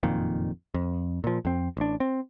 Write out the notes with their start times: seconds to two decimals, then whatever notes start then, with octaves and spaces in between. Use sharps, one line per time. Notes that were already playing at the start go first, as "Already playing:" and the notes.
0.03 F#1 F2 A#2 D#3
0.74 F2
1.24 A#2 F3
1.45 F2 C4
1.77 A1 D4
2.00 C4